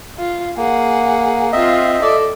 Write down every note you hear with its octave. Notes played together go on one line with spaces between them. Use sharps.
F4
A#3 G#4 F#5
C4 F4 D#5 E5
A4 D5